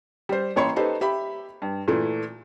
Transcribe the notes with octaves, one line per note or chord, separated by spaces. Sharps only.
G3 C5
A1 A#3 C#5 B5 C6 C#7
D#4 G4 A4 B4 C5
G4 E5 B5
G2
A#2 E3 A3